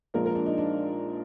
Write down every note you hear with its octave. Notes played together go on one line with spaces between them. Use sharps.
A#1 A#2 F3 G#3 A#4
A#4
D4
D#4
D4